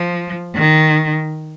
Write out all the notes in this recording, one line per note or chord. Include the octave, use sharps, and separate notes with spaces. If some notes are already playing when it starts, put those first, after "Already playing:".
Already playing: F3
D#3